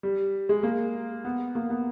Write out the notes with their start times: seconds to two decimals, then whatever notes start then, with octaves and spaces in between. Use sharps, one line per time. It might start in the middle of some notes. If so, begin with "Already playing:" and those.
0.03 G3
0.49 G#3
0.63 A#3
1.25 B3
1.55 A#3
1.70 B3